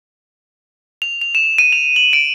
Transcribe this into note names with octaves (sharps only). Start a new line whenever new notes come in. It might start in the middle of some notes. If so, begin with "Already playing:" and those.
F7
F7
E7
D#7
F7
F#7
D7